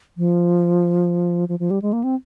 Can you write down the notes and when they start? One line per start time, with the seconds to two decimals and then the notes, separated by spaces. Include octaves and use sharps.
0.18 F3
1.49 F3
1.60 F3
1.71 G3
1.82 G#3
1.93 A#3
2.04 C4